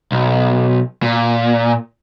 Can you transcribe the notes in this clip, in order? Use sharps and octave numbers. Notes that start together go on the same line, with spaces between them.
B1
A#2